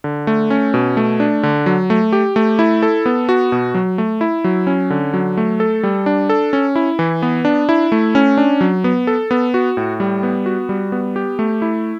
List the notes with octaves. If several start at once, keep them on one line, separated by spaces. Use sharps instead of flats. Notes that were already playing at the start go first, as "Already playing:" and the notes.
D3
A3
C#4
B2
A3
D4
D3
F#3
A3
G4
A3
E4
A4
B3
F#4
B2
F#3
A3
E4
F#3
C#4
D3
F#3
A3
A4
G3
D4
A4
C#4
E4
E3
B3
D4
E4
A3
C#4
D4
F#3
B3
A4
B3
F#4
A2
G3
B3
F#4
G3
B3
G4
A3
E4